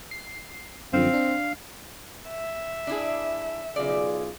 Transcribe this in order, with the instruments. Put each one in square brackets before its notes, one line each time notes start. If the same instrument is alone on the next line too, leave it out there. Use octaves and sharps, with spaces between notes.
[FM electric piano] C7
[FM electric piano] F#2 D3 F3 [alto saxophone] C4 [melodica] F5
[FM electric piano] D4
[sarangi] E5
[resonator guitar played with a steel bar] D4 E4 G#4
[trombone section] B1 F4 G#4 [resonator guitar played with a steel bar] C#3 D5